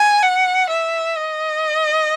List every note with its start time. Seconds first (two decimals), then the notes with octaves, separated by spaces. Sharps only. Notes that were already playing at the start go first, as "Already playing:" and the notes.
Already playing: G#5
0.23 F#5
0.69 E5
1.17 D#5